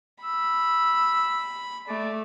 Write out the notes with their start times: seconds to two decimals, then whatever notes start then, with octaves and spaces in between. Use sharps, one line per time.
0.23 B5 E6
1.88 A3 D5